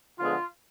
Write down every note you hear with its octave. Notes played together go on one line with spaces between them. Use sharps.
D3 F3 G#3 B3 F4